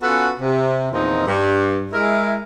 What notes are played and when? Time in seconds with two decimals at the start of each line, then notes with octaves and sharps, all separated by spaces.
0.02 B3 C#4 F4 F#4 A4 B4
0.40 C3
0.92 E2 A#2 D#3 F3 C4 D#4
1.27 G2
1.92 G#3 E4 A#4